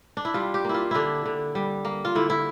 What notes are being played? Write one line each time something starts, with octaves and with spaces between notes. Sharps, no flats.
D4
E4
G3 F4
G4
A#3 E4
F4
D3 D4 E4
D3
G3
A#3
F4
D3 E4
E4